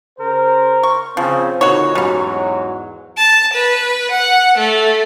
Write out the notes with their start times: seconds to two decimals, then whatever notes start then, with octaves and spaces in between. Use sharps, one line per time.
0.19 C#3 A#4 C5
0.83 C#6
1.17 C#3 F3 C4
1.61 A#2 D3 D#4 F#4 C#5
1.95 E2 G#2 F#3 G3 C#4
3.15 A5
3.52 B4
4.10 F#5
4.56 A3